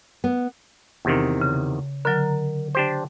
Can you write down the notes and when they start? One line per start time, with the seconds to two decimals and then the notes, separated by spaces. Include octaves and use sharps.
0.24 B3
1.05 E2 C3 D#3
1.41 C#3
2.05 D3 F#3 A#4
2.75 D4 G4 C5